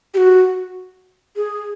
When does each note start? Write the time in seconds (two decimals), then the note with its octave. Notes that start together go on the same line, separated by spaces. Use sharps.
0.14 G4
0.17 F#4
1.36 G#4